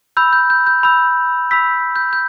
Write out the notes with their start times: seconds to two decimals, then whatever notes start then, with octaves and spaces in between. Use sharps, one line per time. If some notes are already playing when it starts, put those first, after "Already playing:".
0.17 B5 E6 G6
0.33 G6
0.50 G6
0.67 G6
0.83 B5 E6 G6
1.51 B5 E6 G6 B6
1.96 G6
2.13 G6